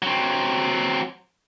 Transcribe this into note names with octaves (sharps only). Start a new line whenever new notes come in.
F#3 C4